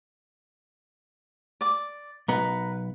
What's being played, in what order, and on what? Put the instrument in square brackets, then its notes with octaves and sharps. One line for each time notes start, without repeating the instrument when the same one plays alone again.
[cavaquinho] D5 D6
[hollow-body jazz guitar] B1 B3 [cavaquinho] A#4 B4